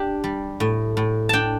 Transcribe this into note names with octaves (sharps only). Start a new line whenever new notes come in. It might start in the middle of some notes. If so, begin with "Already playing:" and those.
Already playing: D4 G4
G3
A2
A2
D4 G5 A5